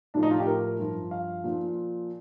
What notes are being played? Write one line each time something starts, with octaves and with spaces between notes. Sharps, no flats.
A2 F3 D4
D#4
F4
G4
A#4
G2 F3
F5
A#2 F3